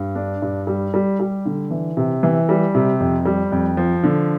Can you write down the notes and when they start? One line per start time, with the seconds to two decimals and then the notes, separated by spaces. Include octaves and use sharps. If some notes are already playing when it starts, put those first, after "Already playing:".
Already playing: G2
0.15 D4
0.42 G2
0.67 G3
0.94 G3
1.20 G3
1.46 D3
1.70 E3
1.97 C3
2.23 E3
2.49 G3
2.75 C3
3.00 F2
3.25 G3
3.52 F2
3.77 F3
4.03 D3